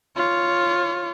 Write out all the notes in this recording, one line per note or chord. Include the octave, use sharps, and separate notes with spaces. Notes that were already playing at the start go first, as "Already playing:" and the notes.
F4 C#5